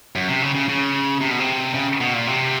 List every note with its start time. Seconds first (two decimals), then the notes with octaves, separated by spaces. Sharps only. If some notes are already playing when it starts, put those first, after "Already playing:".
0.16 F#2
0.28 C3
0.42 C#3
0.55 C#3
0.68 C#3
1.21 C3
1.31 B2
1.40 C3
1.74 C#3
2.01 B2
2.14 A#2
2.27 C3